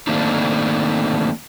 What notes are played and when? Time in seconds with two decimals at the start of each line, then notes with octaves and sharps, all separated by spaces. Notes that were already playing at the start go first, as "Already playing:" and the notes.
0.07 D#3 A3 A#3 C4 D4 D#4